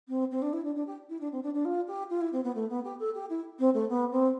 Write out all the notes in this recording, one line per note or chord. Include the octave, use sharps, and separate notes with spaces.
C4
C4
D4
E4
D4
D4
G4
E4
D4
C4
D4
D4
F4
G4
F4
E4
C4
B3
A3
B3
G4
A4
G4
E4
C4
A3
B3
C4